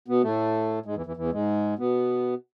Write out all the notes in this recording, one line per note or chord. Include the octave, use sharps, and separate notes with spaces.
B2 B3
A2 A3
G#2 G#3
E2 E3
E2 E3
E2 E3
G#2 G#3
B2 B3